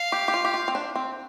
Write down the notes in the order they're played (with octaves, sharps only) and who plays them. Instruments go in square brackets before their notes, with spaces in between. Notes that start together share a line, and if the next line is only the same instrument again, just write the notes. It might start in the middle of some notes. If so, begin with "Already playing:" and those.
Already playing: [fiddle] F5
[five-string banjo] G4
G4
F4
G4
F4
C4
D4
C4